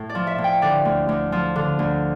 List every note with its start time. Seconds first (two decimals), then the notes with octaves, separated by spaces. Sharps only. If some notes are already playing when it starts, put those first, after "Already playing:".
Already playing: A2
0.09 D5
0.15 F3
0.27 E5
0.38 A2
0.44 G5
0.62 D3 D5
0.85 D2
1.09 D2
1.32 F3
1.56 D3
1.79 D2